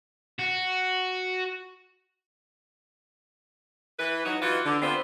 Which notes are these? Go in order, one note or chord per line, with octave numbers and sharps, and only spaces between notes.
F#4
E3 B4
F#3 D#4 F#4
E3 D#4 F4 F#4 B4
D3
B3 C4 D4 F4 G4 C5